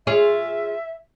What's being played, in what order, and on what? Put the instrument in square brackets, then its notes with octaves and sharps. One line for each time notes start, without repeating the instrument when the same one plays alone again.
[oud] F4 G#4 C#5 [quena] E5